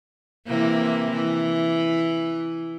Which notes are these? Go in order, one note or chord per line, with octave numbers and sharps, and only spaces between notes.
C3 E3 A#3
E3